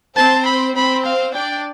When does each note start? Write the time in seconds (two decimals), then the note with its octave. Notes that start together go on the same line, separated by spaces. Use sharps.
0.16 C4 C5 A5
0.46 B5
0.75 C4 C5 B5
1.05 F5
1.33 D4 D5 G5